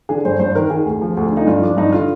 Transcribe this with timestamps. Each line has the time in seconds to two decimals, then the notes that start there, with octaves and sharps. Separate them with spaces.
0.09 D3 G#4
0.25 G2 C5
0.39 G2 C5
0.55 D#3 A#4
0.70 D#3 G#4
0.86 D2
1.02 F3
1.17 D2
1.31 D3
1.37 D#4
1.47 G2 F4
1.62 F3 D4
1.77 G2 D#4
1.92 D3 F4